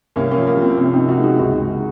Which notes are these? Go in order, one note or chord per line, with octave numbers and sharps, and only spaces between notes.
C2 A#3 C#4
A#3 C#4
F3
A#3
F3
C4
C3 A#3 C#4
C4 D#4
C3
D#4 F#4
G#3 D#4 F#4
C#2 D#4 F#4
C#2